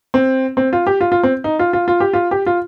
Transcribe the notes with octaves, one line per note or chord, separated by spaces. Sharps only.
C4
C4
F4
G4
F4
F4
C4
D#4
F4
F4
F4
G4
F4
G4
F4